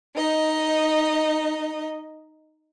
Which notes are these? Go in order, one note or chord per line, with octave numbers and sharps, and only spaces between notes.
D#4 D#5